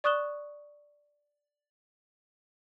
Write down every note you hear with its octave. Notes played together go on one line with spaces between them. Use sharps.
D5 C#6 D#6 F#6 E7 G7